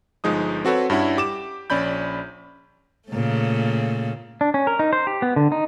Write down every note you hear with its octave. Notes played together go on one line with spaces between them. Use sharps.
G1 F3 G#3 D#4 D#6
C4 F#4 A4 B4 C#5
G2 C#4 E4 F#5
G4 D6 E7
A#1 C#4 D5 B5 G6
A#2 C#3 A3
D4
C#4
A#4
D#4
C5
G4
B3
D3
D#4